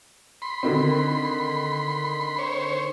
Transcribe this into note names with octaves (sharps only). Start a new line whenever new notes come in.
B5 C6
D3 D#3 C4
C5 C#5